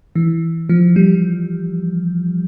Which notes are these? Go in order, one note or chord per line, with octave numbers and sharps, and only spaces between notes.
E3
F3
G3